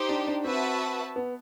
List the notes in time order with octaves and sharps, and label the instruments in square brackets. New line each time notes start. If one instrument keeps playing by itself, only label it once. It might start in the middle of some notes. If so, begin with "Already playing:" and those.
Already playing: [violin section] D#4 G4 C5
[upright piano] D4
D4
[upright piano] C4 [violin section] F#4 B4 E5 A5
[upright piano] B3